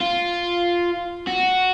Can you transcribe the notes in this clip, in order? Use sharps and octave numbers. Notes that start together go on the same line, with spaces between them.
F4
F#4